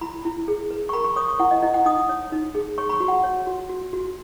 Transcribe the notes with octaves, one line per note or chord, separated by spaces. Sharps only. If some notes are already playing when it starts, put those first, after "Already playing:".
E4 B5
E4
G#4
B4
C#6
A#4 B5
C#6
C#5 D#6
C#6
E4 F#5
D#5
E4 D#5
F#5
D#4 D#6
C#5
D#4
G#4
C#5 C#6
B5
C#6
F#4
F#5
C#5
F#4
F#4
F#4